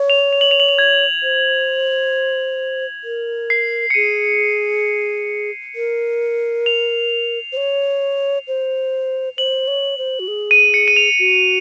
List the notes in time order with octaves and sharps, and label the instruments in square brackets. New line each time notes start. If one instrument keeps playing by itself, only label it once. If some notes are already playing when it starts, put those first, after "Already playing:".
Already playing: [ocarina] C#5
[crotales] F7
F7
F#7
F7
F#7
F7
G#6
[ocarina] C5
A#4
[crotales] C7
C#7
[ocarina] G#4 [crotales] D#7
[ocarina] A#4
[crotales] F7
[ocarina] C5
C#5
C5
[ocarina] C5 [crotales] F#7
[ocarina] C#5
C5
F#4
G#4
[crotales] D#7
C#7
D#7
F7
[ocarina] F#4